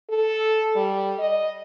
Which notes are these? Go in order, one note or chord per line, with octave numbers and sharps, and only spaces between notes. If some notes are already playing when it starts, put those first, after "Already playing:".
A4
G3
D#5